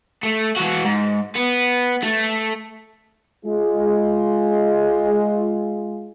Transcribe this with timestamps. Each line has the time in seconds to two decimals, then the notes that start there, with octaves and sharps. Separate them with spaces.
0.23 A3
0.57 E3 F#4
0.85 G#2
1.36 B3
2.02 A3
3.45 G#3 F4 G#4